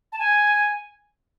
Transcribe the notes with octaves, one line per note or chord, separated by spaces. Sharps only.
A5
G#5